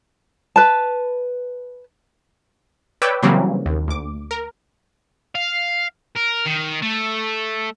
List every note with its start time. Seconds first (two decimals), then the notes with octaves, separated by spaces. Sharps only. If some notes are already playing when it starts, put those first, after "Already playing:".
0.56 B4 A5
3.02 B4 C#5 D5 G5 D6 E6
3.23 C#3 E3 F#3 G3 A#3 C4
3.66 D#2
3.88 D2 D6
4.31 A#4
5.35 F5
6.16 A#4
6.45 D#3
6.82 A3